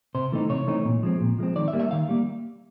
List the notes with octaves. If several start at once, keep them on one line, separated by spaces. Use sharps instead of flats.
C3 C5
E3 A3 C4 D#4
C3 C#5
E3 A3 C4 D#4
A#2
F3 G#3 C4
A#2
F3 G#3 C4
D#3 D5
E5
G3 A#3
E5
D#3 F5
G3 A#3